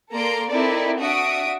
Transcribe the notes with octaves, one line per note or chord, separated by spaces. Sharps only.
A#3 A4 D5 A#5 C6 D7
C4 D#4 E4 A4 A#4 D5
D4 F#4 E5 D#6 D7